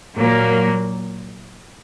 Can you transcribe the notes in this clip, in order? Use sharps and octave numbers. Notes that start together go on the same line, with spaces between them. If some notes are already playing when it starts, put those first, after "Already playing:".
A#2 F#3 A#3